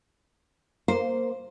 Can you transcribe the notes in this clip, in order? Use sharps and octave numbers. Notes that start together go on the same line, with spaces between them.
A#3 C5